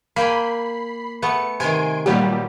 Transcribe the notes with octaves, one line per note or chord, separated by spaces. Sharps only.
A#3 G5 G#5 B5 C7
A3 B3 C#7
C3 D#3 G#5 C6 D7
A#2 F#3 G3 B3 G4